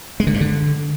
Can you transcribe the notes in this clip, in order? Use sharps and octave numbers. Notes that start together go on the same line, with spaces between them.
G#3
D3
G2
D3